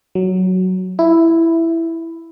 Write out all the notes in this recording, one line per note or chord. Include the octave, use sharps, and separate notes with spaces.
F#3
E4